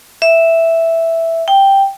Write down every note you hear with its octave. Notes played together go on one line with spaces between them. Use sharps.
E5
G5